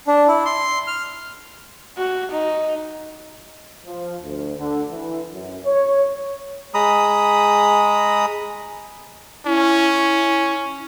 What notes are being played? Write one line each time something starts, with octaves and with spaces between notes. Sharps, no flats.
D4
E4
C6
F6
F#4
D#4
F3
D2
D3
E3
F#2
C#5
G#3 A#5 B5 D#6
C#4 E4